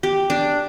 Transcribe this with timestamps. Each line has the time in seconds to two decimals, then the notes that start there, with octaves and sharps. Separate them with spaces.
0.03 G4
0.30 D4